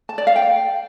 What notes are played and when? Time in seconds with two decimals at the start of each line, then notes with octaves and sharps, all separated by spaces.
0.09 A5
0.18 D5
0.27 F5
0.36 G5